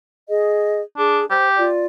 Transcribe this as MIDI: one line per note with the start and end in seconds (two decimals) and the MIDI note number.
0.29 0.80 68
0.29 0.80 75
0.97 1.21 62
0.97 1.23 68
1.30 1.67 67
1.30 1.48 72
1.57 1.86 65
1.57 1.86 74